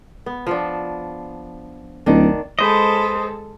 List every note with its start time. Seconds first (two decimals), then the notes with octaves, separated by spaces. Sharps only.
0.26 B3
0.47 F3 B3 D4
2.06 D1 D#3 D4
2.59 G#3 A4 B4 C5 D#5